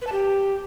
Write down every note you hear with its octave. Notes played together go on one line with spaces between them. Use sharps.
B4
A5
G4